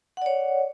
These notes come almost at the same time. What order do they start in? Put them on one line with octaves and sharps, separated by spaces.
F#5 D5 C#5